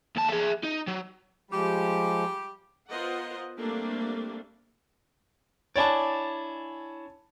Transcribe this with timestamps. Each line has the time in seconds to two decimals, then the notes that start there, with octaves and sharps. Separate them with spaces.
0.16 D#2 A5
0.29 G#4 E5
0.64 D#4
0.88 F#3
1.51 F3 G3 G#3 G4
2.89 B3 F4 A#4 C5 D#5 F#5
3.58 G3 A3 A#3 C4 D4
5.76 D4 E4 C#5 D5 G#5 A5